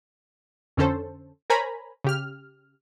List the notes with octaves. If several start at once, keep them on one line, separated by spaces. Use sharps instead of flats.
F2 D3 C#4 A4 C5
A#4 C5 C#5 G#5 A#5 B5
C#3 G4 F6